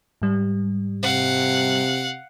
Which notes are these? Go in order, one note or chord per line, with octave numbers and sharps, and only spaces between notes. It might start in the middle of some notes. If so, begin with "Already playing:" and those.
G#2 G3
C3 F5 F#5